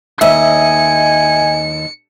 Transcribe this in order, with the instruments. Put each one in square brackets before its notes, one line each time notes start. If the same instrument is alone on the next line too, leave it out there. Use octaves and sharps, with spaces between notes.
[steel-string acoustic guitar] D#2 D#5 [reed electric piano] E5 [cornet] G#5 [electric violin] C#7